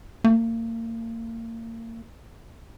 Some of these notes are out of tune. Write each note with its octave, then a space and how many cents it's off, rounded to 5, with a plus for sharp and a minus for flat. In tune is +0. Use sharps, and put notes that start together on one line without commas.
A#3 -35